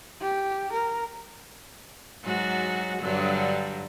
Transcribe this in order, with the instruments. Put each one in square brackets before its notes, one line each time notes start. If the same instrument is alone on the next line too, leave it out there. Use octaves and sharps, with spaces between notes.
[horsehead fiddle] G4
A#4
[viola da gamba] G#2 F#3 F#4
G2 D3 F#3